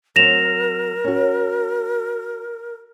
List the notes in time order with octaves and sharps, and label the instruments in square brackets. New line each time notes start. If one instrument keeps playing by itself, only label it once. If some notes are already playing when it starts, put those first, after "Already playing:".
[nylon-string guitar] F#3 C4 [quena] A#4 [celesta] A#6 E7 F7
[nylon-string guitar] C#4 F#4